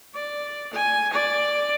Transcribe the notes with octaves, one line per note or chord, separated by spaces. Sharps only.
D5
G#5
D5